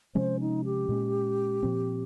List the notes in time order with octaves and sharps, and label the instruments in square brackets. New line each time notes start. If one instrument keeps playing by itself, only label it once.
[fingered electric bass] C3 F3 G#3 C#4 [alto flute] C5
[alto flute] D#4
G4
[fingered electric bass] A#2 G#3 C#4
A#2 F3 C4